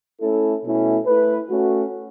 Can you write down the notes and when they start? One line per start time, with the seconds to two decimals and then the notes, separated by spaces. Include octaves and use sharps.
0.21 A3 C#4 E4 A4
0.64 B2 A3 C#4 E4
1.06 A3 E4 B4
1.50 A3 C#4 F#4